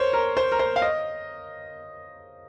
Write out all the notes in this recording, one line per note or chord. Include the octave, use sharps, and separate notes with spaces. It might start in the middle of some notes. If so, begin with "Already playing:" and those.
Already playing: A#4 C5 C#5
A#4
C5
A#4
C5
F5
D#5